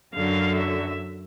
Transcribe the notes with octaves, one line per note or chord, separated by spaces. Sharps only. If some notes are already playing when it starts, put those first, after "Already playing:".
F#2 D3 F#3 F5
E5